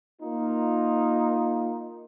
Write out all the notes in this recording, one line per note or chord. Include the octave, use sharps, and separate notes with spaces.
A#3 D#4 F4